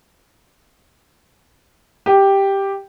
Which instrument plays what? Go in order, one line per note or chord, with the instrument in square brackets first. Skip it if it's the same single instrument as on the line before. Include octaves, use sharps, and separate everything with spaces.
[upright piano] G4